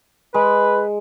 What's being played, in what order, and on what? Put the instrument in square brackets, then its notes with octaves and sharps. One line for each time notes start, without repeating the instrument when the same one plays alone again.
[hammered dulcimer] G#3 [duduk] B4